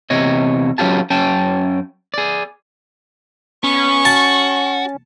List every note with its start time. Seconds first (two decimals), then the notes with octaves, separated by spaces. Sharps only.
0.10 E2 C3 C#5 D#5
0.78 F#3 C#4 F4 G4 A5
1.10 F#2 C#4 G5 A5
2.14 G#4 D5
3.64 B3 C#4 C#6
4.05 F#4 A5